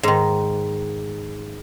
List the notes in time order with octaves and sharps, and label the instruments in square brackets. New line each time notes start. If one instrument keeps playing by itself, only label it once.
[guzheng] G#2 D#3